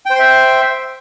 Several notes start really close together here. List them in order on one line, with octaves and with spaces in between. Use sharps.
G5 C5 C6 E5